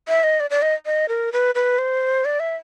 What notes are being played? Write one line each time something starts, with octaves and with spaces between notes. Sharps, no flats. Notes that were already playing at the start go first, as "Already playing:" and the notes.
E5
D#5
D5
D5
D#5
D#5
A#4
B4
B4
C5
D5
E5